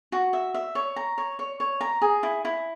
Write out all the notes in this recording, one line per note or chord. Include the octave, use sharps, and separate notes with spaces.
F#4
E5
E5
C#5
A#5
C#5
C#5
C#5
A#5
G#4
E4
E4